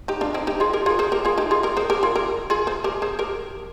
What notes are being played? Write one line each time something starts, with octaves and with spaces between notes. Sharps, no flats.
D#4 G4
D4 F4
C4 D#4
D#4 G4
F4 G#4
G4 A#4
F4 G#4
G#4 C5
G4 A#4
F4 G#4
D#4 G4
F4 G#4
G4 A#4
G#4 C5
G4 A#4
F4 G#4
G4 A#4
F4 G#4
G#4 C5
G4 A#4
G#4 C5
G4 A#4